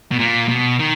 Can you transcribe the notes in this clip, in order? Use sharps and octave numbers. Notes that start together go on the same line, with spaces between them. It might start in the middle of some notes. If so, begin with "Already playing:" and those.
B2
A#2
B2
D#3